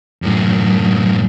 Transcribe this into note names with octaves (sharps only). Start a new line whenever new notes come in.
F#2 A2